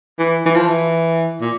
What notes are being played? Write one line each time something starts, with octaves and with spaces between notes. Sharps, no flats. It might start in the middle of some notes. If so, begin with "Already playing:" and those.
E3
E3
F3
E3
A#2